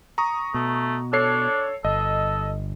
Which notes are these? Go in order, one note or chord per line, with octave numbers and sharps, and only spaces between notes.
A#5 C#6 D#6
B2 A3
D4 A4 C#5 C7
G1 A4 D#5